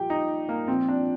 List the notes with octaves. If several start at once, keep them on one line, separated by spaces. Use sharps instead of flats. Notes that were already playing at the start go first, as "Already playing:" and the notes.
Already playing: A#2 F3 G4 G5
D#4
A#3
A#2 F3 C4
D4